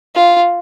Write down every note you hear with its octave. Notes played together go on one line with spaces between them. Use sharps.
F4